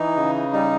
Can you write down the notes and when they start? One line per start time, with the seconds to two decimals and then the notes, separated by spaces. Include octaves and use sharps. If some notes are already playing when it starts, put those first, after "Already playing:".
Already playing: E3 D#4
0.16 C#3
0.53 G3 D#4